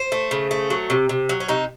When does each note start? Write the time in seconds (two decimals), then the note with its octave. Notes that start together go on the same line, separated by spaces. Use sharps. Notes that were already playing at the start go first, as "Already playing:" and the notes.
Already playing: C5
0.12 A3
0.31 C#3
0.51 A3
0.70 F#3
0.90 C3
1.09 C3
1.29 F#3
1.40 C#4
1.48 C3 D#4